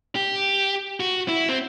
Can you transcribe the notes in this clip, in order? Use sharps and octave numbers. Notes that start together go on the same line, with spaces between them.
G4
F#4
E4
C4